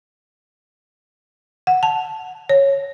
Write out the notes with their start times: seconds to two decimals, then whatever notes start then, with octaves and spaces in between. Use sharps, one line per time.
1.67 F#5
1.83 A5
2.49 C#5